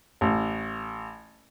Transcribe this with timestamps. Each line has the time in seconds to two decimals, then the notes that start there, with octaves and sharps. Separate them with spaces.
0.21 A1